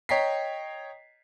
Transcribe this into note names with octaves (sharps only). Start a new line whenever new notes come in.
C#5 D#5 G5 A#5 B6 C7